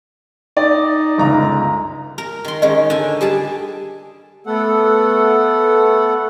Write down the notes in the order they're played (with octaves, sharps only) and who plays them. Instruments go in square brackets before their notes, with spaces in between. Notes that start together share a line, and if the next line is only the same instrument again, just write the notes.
[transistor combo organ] D#4 [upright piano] D5
[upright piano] G1 C#2 A#5
[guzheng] A#4 A#5
D#3 C6
[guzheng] D#3 G#3 C#4 [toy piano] D#5
[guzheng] D3 G#5
G3 G#4 A5
[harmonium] A3 B3 A4 F#5